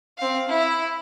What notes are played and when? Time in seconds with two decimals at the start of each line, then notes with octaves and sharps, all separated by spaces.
0.17 C4 F5
0.48 E4